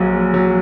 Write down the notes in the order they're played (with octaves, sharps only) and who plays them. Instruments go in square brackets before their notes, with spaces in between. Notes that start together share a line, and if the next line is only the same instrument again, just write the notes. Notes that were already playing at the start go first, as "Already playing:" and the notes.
Already playing: [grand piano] A#1 A#2 F#3
F#3